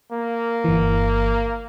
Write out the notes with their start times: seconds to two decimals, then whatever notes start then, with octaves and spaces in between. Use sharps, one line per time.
0.12 A#3
0.64 G1 E3